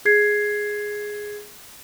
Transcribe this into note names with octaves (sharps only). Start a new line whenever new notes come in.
G#4 G#6 C7